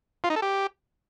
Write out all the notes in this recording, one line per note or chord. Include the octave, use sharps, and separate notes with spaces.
F4
D#4
A4
G4